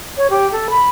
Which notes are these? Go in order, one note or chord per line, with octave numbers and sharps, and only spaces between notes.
C#5
G4
A4
B5